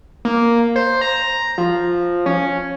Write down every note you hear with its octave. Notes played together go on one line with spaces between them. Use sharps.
A#3
C5
A#5
F3
C#4